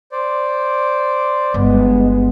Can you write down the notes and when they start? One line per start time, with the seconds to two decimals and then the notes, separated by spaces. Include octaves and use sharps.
0.12 C5 D5
1.54 G1 G#3 B3